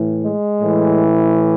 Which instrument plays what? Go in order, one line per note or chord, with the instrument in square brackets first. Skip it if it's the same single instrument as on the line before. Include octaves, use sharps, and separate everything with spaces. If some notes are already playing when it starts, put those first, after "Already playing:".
Already playing: [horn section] A2 E3
G#3
A2 E3